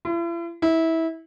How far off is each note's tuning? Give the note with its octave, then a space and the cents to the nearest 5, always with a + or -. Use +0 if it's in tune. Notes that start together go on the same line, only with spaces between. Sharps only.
E4 +45
E4 -20